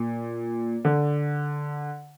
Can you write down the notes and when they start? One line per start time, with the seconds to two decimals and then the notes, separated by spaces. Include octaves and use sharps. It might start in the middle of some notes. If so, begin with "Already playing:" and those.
Already playing: A#2
0.85 D3